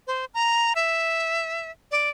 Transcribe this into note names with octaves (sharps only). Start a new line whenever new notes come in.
C5
A#5
E5
D5